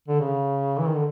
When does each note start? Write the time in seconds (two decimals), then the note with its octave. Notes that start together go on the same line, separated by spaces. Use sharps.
0.08 D3
0.20 C#3
0.79 E3
0.88 D#3
0.96 D3